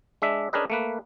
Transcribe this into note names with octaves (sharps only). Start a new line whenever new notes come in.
G#3 D4 E5
C#4 D4 G#4 A#4 B4 D#5
A3 A#3 B4